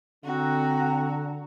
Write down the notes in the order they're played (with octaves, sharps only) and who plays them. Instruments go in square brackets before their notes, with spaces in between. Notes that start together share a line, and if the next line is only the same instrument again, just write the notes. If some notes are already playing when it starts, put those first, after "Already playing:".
[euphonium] D3 [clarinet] C4 [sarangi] F#4 [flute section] F#5 A#5